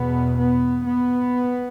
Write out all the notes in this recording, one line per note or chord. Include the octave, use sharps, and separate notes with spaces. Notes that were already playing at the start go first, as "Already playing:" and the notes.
Already playing: E2 B2 B3
B3
B3